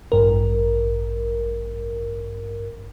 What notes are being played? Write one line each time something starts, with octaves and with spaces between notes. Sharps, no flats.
A1 G2 A#4